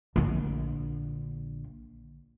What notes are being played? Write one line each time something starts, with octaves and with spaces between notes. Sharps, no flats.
A#1 D3